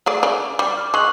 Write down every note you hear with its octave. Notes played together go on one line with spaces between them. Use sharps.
A3 G#4 D5
C#3 D5
G3 D6 A6
F6
G#3 C#6 F#6 F#7